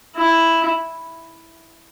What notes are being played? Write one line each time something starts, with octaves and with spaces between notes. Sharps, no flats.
E4